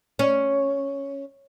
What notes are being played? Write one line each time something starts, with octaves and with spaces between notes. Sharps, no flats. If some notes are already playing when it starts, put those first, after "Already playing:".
C#4